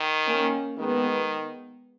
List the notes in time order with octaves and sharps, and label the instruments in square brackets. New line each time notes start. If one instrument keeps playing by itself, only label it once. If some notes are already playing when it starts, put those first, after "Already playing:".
Already playing: [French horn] D#3
[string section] A#3 C#4
[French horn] D#3 [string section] G#3 B3